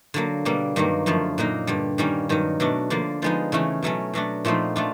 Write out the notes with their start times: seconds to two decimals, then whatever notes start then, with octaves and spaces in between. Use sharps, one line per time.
0.14 D3 F#3 A#3
0.45 B2 G3 A#3
0.76 G2 D#3 F#3 A#3
1.06 F#2 D3 F3 A3
1.38 A#2 F#3 A#3 D#4
1.67 G2 D3 G3
1.98 D#3 G3 A#3 C#4
2.29 G2 D#3 F#3
2.60 B2 F#3 A3 D4
2.90 D3 F3 A#3 D4
3.22 D3 F3 G#3 B3 D#4
3.52 C#3 E3 A3 C#4
3.82 B2 F#3 A3 C#4
4.14 B2 F#3 A3 D4
4.45 A#2 F3 A3 C4 D#4
4.76 A3 D4 F4